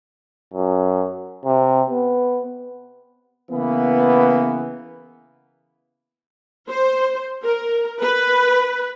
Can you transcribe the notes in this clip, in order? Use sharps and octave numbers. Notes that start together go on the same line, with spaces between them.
F#2
C3
B3
C#3 E3 A#3 B3
C5
A#4
B4